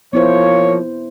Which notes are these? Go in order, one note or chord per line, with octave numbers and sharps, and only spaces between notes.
F3 A#3 B3 E4 C5 C#5